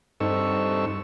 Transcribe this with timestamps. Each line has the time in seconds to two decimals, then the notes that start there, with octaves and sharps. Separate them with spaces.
0.20 G2 C4 D#4 A4 C#6 E6